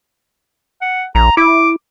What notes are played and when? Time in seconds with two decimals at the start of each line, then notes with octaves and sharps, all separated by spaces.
0.81 F#5
1.15 A#1 A#5
1.37 E4 D6